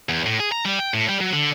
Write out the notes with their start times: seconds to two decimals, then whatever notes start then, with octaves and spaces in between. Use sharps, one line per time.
0.09 E2
0.26 A2
0.40 G#4
0.52 A#5
0.65 G3
0.79 G5
0.94 A2
1.09 G3
1.21 F#3
1.33 D3